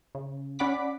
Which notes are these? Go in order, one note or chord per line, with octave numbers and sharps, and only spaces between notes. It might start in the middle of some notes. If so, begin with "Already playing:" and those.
C#3
C#4 D5 F#5 B5 D6 B6